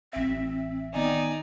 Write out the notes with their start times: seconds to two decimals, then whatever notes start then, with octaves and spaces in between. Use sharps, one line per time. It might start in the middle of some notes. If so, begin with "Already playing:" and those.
0.13 A1 C4 E5
0.94 D#3 B3 D#4 D5 G#5